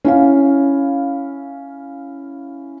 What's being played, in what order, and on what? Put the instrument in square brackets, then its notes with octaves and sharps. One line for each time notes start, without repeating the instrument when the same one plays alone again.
[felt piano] C#4 E4 F5